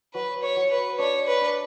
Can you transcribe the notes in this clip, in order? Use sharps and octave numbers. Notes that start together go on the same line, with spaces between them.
F#3 B4
C#5
F#3
B4
D4 C#5
B4
D4